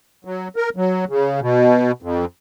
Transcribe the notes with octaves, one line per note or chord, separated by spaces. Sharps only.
F#3
A#4
F#3
C#3
B2
F2